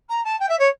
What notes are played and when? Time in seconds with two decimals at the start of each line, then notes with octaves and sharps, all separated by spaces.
0.09 A#5
0.24 A5
0.40 G5
0.48 E5
0.59 C#5